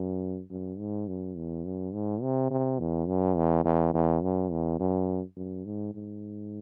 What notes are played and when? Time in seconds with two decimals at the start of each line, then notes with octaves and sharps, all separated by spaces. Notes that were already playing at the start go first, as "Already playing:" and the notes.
Already playing: F#2
0.50 F#2
0.79 G#2
1.08 F#2
1.36 E2
1.65 F#2
1.93 G#2
2.22 C3
2.50 C3
2.79 E2
3.08 F#2
3.36 E2
3.65 E2
3.93 E2
4.23 F#2
4.51 E2
4.80 F#2
5.36 F#2
5.65 G#2
5.94 G#2